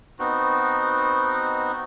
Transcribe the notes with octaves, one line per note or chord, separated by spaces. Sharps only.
B3 C4 D#4 F#4